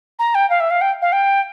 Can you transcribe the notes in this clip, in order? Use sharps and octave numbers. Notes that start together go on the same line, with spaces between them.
A#5
G5
F5
E5
F5
G5
F5
G5